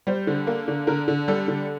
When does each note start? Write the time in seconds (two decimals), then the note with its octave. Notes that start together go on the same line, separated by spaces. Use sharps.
0.07 G3 C5
0.27 D3
0.47 A#3
0.68 D3
0.87 D3 A#4
1.08 D3
1.28 G3 A4
1.48 D3